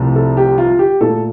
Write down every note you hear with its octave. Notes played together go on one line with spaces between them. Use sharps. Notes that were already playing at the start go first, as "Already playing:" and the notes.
Already playing: C2 C3 F3 A3
A4
G4
F4
G4
A#2 A3 A4